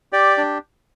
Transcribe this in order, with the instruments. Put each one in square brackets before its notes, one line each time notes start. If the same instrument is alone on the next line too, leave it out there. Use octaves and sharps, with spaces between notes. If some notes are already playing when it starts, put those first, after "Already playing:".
[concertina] G4 D5
D4